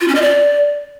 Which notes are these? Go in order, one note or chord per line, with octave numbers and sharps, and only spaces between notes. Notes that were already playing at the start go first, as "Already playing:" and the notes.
F4
C#4
D#5
D5